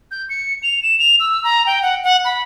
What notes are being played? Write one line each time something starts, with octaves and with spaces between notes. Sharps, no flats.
G6
C#7
F7
E7
F7
E6
A#5
G5
F#5
F#5
B5